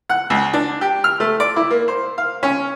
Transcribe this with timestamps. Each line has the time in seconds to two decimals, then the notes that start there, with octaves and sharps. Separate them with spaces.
0.09 F#5
0.30 C#2
0.53 D4
0.81 G4
1.04 F6
1.20 A3
1.40 D5
1.56 E4
1.70 A#3
1.88 C5
2.18 F5
2.43 C#4